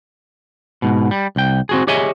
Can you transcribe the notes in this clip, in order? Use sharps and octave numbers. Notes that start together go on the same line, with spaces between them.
G#2 B2
G3
C2 G5
C4 F#4 G#4
G4 G#4 C#5 D#5 E5 G#5